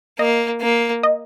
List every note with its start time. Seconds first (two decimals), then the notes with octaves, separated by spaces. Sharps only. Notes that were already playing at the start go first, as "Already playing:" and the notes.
0.19 A#3 D#5
0.61 A#3
1.03 D#5